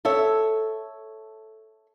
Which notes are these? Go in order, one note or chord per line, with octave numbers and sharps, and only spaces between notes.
A4 C#5 E5